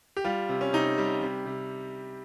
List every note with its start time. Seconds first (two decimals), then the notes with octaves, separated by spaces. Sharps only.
0.17 G4
0.24 G3 F4
0.49 C3
0.61 C#4
0.73 C3 D#4
0.98 G3
1.21 C3
1.46 C3